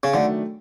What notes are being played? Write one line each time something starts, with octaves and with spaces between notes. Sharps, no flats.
C#3
D3 D#3 F#3 A3 D4